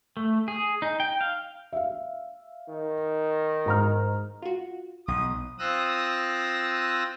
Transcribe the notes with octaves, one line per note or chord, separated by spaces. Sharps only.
A3
G#4
D#4
G5
F5
E5 F5
D#3
G#2 A#5 F6
F4 F#4
B1 D#6
C4 F4 D#6 E6 F#6 A#6